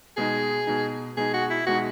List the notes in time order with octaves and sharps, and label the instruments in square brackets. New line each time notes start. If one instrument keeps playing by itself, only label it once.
[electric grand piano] B2 G#3 D#4 [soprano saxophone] G#4
[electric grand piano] B2 G#3 D#4
[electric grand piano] B2 G#3 D#4 [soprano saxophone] G#4
[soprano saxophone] F#4
E4
[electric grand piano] B2 G#3 D#4 [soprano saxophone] F#4